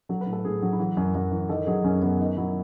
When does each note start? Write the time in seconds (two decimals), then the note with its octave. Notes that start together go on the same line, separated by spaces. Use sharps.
0.09 F#3 A4
0.21 B4
0.26 A2
0.33 A4
0.45 A2 G#4
0.62 F#3
0.73 E4
0.79 E3 F#4
0.97 F#2
1.15 F#2 F#4
1.31 E3
1.49 D#3 A4
1.66 F#3 G#4
1.84 F#2 C#4
2.02 F#2 B3
2.19 D#3 D#4
2.37 F#3 E4